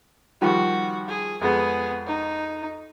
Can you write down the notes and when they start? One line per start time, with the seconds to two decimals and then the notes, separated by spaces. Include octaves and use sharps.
0.42 D#3 F3 G3 F#4
1.09 G#4
1.41 F2 G#3 B3 G#4
2.06 D#4